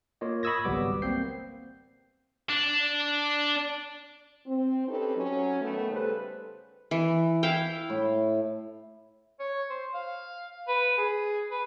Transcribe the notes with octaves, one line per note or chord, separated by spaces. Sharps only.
A#3 F4 C#5 D#5
B5 C#6 D#6 E6 G#6 A#6
G#1 C#2 F#3 G3 B3 D6
A#3 C4 G6 C7
D4
C4
C4 C#4 D#4 G4 A4 B4
F#3 C#4
D#3 A3 B3
C#3 G3 A4 B4 C5
E3
E4 F5 G5
A2
C#5
C5
F5
B4
G#4
B4